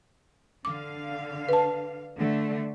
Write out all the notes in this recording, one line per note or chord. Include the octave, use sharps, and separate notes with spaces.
D3 F5 D6
B4 A5
D3 A3